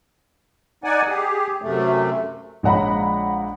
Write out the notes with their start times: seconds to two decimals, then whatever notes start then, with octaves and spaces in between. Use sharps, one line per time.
0.84 D#4 D5 F#5 G#5
1.08 G4 G#4
1.62 F#2 C3 A3
2.63 A#1 G#3 C#5 F#5 A#5 B5